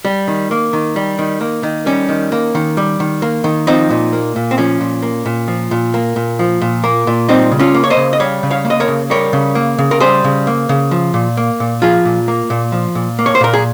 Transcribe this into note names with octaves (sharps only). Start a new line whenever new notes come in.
G3
D#3
A#3
D#3
G3
D#3
A#3
D#3
G3 C#4
D#3
A#3
D#3
G3
D#3
A#3
D#3
F3 C4 D#4
A#2
A#3
A#2
C4
F3 C#4
A#2
A#3
A#2
F3
A#2
A#3
A#2
F3
A#2
A#3
A#2
G3 C4 D#4
C#3
C#4 F4
A#3
C#5
C5 D#5
C#3
D#5
G3 C#5 F5
C#3
C#5 F5
A#3
D#5
A#4 C#5
C#3
G3 A#4 C#5
C#3
A#3
C#3
A#4
G3 G#4 C5
C#3
A#3
C#3
F3
A#2
A#3
A#2
F3 F4 G#4
A#2
A#3
A#2
F3
A#2
A#3
C#5
C5
A#2 A#4
G#4